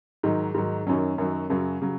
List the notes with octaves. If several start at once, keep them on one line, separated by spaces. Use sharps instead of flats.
G#2 D#3 F#3
G#2 D#3 F#3
F#2 D#3 F#3 C#4
F#2 D#3 F#3
F#2 C#3 F#3
C#3 F#3